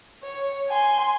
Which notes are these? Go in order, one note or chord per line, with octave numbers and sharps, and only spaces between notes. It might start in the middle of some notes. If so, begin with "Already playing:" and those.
C#5
G#5 C6